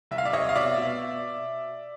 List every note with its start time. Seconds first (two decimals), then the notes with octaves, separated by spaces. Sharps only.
0.11 C2 E5
0.18 F5
0.25 D5 E5
0.33 C2 C#5 D#5
0.49 F5
0.55 B2 D5 E5
0.77 B2